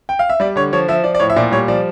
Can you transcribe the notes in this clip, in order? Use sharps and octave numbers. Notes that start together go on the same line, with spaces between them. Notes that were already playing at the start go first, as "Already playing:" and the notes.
G5
F5
E5
G3 D5
D3 C#5
F3 C#5
F3 E5
F3 D5
D5
A2 C#5
E5
A#2 D5
G3 C#5
F3 D5